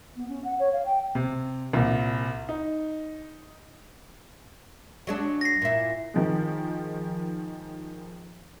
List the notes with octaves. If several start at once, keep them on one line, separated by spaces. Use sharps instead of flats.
B3
C#4
F#5
C#5
F5
G5
C3
C2 A#2
D#4
F#3 G#3 D4
A#6 C7
A#2 E4
D#3 F3 G#3